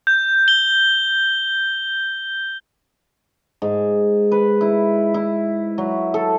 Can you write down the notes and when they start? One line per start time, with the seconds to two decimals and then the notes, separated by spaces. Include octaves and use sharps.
0.07 G6
0.48 G7
3.62 G#2
4.32 B4
4.61 E4
5.14 E4
5.78 F#3
6.14 A4